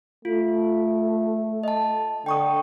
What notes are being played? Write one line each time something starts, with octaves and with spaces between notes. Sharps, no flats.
A3 F4
D#5 A5
D3 G5 C#6 D#6